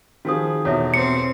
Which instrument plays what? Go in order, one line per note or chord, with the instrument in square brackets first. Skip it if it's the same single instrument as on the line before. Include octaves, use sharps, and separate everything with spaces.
[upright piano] D#3 F3 G#4 [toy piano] F#4 A5 D#6
[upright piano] E2 B2 [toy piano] A4 C#5 E5
[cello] C4 [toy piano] G#4 [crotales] C#7